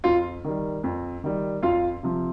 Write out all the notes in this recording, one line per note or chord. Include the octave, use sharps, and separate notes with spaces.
F2 F4
D#3 G3
F2
D#3 G3
F2 F4 F5
C3 F3